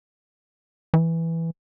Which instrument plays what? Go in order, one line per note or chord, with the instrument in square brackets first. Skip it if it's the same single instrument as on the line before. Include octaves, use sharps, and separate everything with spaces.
[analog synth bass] E3